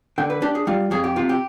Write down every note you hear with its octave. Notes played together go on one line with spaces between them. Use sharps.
D3 G5
B4
D4 G4
G#4
G3 F4
F2 G#4
G4
C3 F4
G4